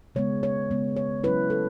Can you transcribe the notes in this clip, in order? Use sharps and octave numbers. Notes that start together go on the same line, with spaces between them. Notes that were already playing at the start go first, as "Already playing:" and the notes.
C#3 G#3 B3 C#5
C#5
C#3 G#3 B3
C#5
F#3 C#4 E4 B4
A4